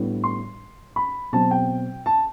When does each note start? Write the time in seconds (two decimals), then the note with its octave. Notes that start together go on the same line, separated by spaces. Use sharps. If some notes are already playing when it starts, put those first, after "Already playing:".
Already playing: A2 G3 B3 D4
0.24 C6
0.96 B5
1.32 B2 F#3 C4 A5
1.51 G5
2.06 A5